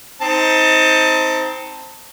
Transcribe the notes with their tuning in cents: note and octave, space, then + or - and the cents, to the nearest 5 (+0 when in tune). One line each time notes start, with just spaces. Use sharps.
C4 +0 D#4 +25 A5 +20